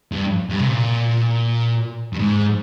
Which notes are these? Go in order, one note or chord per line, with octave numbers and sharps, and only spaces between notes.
G2
G2
C3
A#2
G2
G#2